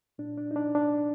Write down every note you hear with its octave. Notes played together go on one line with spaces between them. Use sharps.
A#2 D4
D4
D#4
D4
D4